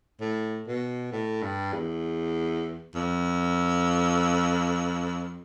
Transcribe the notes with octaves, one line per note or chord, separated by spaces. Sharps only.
A2
B2
A2
G2
E2
F2